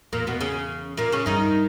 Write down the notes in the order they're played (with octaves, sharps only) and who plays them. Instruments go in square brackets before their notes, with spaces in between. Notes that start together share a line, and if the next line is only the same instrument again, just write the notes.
[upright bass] E2 [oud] A#2 A#3
[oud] B2 B3
C#3 C#4
A#2 A#3
C#3 C#4
[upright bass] G2 [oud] D#3 D#4